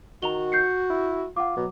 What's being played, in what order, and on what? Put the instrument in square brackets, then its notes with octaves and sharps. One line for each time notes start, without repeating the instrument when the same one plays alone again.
[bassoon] D#3 [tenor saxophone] F#4 [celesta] A#5 F7 G7
[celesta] G6 C7 C#7
[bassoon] E4
[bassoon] F4 [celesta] F#5 D6
[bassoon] B2 [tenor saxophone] F#3